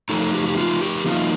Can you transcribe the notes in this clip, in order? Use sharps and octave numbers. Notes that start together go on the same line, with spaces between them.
F3 A3 D#4 A4
A4
G4
G4
F4
G4
F3 A#3 D#4 F4